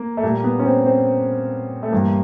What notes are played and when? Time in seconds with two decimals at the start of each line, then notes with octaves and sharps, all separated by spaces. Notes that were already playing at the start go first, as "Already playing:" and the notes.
Already playing: A#3
0.17 A3
0.23 A#2 G3 A#3
0.44 B3
0.59 C#4
0.66 C4
0.86 C4
1.83 A3
1.92 G2 E3 G3 A#3